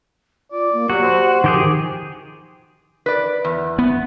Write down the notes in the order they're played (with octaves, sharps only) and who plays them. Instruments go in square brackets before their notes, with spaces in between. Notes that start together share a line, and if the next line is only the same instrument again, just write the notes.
[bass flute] F4 [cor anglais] D5
[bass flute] A#3
[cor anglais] F#3 [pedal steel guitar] F#4 [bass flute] G4
[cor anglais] C5
[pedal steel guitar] D#3 G4 G#4 [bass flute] F3
[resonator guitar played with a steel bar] B4 D5
E2
[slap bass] B3